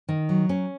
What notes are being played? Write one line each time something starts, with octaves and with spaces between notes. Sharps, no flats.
D#3
F#3
C#4